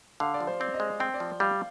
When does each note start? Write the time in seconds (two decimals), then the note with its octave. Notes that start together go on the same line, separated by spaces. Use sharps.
0.20 D3 F5
0.34 D5
0.40 F3
0.47 C5
0.60 C4 D5
0.74 D#5
0.80 G#3
1.00 C4 G5
1.14 D5
1.20 F3
1.40 G3 F5